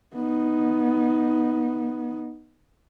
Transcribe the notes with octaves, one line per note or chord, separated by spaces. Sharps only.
B3 D#4